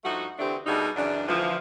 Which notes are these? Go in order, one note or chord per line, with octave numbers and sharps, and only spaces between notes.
G2 F3 A3 D#4 F#4
D3 E3 A3 C4 D4 G4
B2 G3 A3 D4 D#4 G#4
F#2 C#3 E3 D4
D2 D3 E3 F3